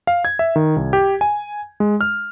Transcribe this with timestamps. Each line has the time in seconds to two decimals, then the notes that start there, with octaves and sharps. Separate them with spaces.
0.07 F5
0.25 G#6
0.39 E5
0.56 D#3
0.76 C2
0.93 G4
1.21 G#5
1.80 G#3
2.01 F6